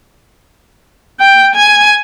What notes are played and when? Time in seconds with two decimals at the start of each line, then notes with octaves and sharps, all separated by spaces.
1.20 G5
1.55 G#5